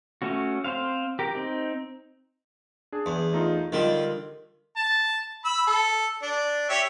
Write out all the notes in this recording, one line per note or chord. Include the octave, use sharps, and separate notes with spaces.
A3 C#4 F#4
C4 C5 F5
G4 A#4
C4 D#4
D4 G#4
E2
A3 D#4 F4
D3 D#3 G3 F4
A5
B5 E6
A4
D4
G4 C#5 E5